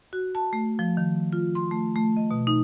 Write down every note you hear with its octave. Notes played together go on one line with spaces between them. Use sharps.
F#4
A5
A3
F3
D#3
F4
C6
A3
A3
D#5
B2
D#4